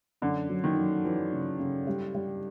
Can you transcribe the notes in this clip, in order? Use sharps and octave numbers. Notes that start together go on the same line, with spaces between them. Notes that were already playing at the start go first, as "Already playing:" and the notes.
F#2 D3
F#3
D#3
F#3
E3 F#3
C#3
C#3
G3
G3